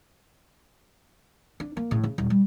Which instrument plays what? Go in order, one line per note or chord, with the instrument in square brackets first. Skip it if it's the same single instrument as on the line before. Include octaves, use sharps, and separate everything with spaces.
[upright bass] D4
A#3
A2 C#3
C#3
D#1
G3